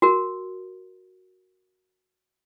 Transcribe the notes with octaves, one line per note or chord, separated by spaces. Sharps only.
F#4 A#4